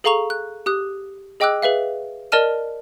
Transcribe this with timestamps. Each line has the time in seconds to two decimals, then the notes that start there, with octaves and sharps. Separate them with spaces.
0.04 G#4 A4 F5 A#5 C#6 F7
0.30 F#6
0.66 G4 D#6 F#6
1.40 G#4 D#5 G5 D6 E6 F#6
1.62 G#4 B4 E5 F5
2.32 A#4 D5 D#5 A5 F6 D#7